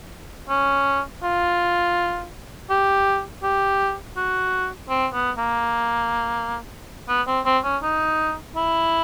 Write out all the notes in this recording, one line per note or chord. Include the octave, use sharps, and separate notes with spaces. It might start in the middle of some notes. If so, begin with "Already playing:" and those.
C#4
F4
G4
G4
F#4
C4
B3
A#3
B3
C4
C4
C#4
D#4
E4